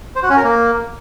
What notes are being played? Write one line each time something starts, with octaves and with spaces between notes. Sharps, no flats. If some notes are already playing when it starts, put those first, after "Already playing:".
C5
F#4
C#4
A#4
A#3